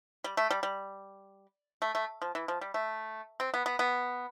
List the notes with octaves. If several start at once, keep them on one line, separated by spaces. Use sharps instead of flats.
G3
A3
G3
G3
A3
A3
F3
E3
F3
G3
A3
C4
B3
B3
B3